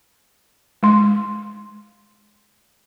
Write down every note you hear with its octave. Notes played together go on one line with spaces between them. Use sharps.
G#3 C6